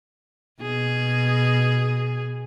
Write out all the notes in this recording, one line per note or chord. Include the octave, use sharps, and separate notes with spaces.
B2 G#4